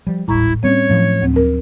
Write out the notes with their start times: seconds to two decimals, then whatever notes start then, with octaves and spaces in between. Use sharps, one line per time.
0.07 F3 G3
0.28 D#1 G#1 A2 G3 E4 A#5 C#6
0.63 G3 A#3 C4 C#4 C#5
0.89 A2 F3 F#3 A3
1.22 D2 C4
1.34 C4 A#4